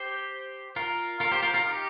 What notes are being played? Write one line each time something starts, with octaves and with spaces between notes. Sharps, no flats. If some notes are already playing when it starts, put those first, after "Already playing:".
Already playing: G4 C5
F4 A#4
F4 A#4
G4 C5
F4 A#4
F4 A#4
D#4 G4